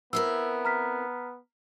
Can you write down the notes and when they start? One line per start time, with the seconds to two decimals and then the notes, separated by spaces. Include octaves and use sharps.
0.13 B3 C4 E4 A#4 E6
0.65 A#5 F6 B6